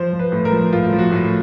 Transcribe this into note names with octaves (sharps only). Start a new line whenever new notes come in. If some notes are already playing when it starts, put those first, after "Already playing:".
Already playing: F3 C5
F3
B4
A2
A#4
F3
A2 F4
F3
F#4
A2